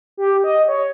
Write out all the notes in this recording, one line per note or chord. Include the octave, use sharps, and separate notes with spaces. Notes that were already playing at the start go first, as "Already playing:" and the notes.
G4
D#5
C#5